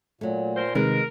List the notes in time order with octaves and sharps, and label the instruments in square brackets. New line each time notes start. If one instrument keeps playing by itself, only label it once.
[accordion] A#2 [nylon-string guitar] F#3 A3
[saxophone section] D#2 A#4 C5
[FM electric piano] C3 D#3 [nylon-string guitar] G#3 B4 [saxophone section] A#4